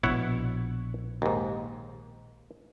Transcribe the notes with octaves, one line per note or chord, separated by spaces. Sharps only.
A#1 B2 E4 C#5 F#5
D#2 G#2